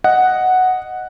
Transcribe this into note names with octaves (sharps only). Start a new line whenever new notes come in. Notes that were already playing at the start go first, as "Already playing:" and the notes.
D#5 F#5